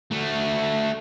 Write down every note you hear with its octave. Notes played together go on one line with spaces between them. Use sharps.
A3 F#4